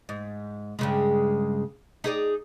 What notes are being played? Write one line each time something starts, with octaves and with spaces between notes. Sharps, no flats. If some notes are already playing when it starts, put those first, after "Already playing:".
G#2
G2 C#3 G#3
D#4 G#4 D5